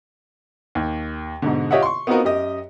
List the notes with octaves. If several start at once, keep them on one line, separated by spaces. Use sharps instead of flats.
D#2
G#2 B2 D3
F4 G4 C#5 D#5 E5 F#5
C6 C#6
B3 C4 D#4 F4 F#4 A#4
F#2 G4 D#5